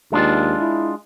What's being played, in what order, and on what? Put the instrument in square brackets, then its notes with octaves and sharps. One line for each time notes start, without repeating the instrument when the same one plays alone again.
[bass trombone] D#2 [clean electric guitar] G#3 D4 F4
[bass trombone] E4